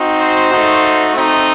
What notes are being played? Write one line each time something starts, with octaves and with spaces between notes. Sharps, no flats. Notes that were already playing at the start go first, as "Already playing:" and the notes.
Already playing: C4 D#4 F#4
C5
A3 D#4 F#4
A3 C4 D#4